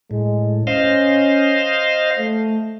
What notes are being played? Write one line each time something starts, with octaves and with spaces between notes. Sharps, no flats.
A2 G#3
C#4 C5 D#5 F5
A3